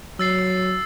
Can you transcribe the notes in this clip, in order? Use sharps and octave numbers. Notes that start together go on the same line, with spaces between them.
F#3 E6 A6 C7